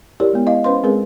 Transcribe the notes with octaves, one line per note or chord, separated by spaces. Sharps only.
E4 G4 A#4 C#5 D5
G#3 B3
E4 D#5 F5
C#4 B4 C5 F5 C6
G#3 C4 G#4 A#4 B4